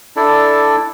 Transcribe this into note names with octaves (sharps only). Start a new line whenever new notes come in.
D4 E4 A4 D5